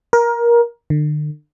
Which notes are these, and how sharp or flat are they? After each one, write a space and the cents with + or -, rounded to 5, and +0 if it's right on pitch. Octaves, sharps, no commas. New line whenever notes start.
A#4 +20
D3 +40